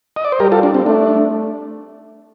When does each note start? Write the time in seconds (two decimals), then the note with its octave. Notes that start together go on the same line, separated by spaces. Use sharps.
0.16 D#5
0.25 D5
0.32 C5
0.40 G3 G4 A#4
0.52 F4 A4
0.63 D4
0.74 C4
0.86 A3 D4